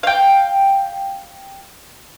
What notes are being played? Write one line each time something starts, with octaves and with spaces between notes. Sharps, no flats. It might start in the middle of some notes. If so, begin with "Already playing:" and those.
F5 G5